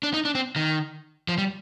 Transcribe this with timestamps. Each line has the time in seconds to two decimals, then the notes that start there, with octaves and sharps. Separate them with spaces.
0.03 D4
0.14 D#4
0.25 D4
0.35 C4
0.56 D#3
1.28 F3
1.38 G3